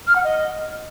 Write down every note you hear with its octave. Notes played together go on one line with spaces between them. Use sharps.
F6
F#5
D#5